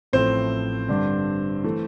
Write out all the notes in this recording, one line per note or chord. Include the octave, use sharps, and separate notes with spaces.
A1 A2 F3 A3 C4 C5
G2 D3 G3 D4
E3 A3